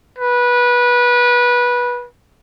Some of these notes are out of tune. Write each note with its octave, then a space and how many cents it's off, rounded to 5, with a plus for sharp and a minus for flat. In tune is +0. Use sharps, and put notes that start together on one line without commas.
B4 -20